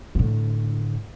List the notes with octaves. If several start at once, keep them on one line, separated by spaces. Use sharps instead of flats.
A2 D3